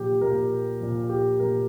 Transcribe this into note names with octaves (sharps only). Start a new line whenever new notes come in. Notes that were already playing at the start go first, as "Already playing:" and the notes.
Already playing: A#2 F3 G4
A#2 F3 A#4
A#2 F3
G4
A#2 F3 A#4